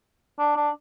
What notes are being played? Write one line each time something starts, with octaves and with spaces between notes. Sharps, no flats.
D4
D4